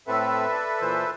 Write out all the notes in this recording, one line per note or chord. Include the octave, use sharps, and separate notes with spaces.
A2 C4 A4 B4 E5
D5
A#2 E3 C5